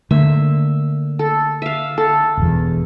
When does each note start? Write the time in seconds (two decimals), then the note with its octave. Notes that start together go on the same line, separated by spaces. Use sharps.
0.11 D3 A3 A#3 E5
1.19 A4
1.62 E5 F5
1.98 A4
2.37 E1 E2